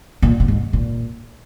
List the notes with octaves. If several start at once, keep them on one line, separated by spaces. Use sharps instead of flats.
A#2
A#2
G#2
A#2